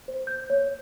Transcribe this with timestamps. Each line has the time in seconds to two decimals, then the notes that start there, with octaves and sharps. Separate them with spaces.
0.08 C5
0.27 G6
0.50 C#5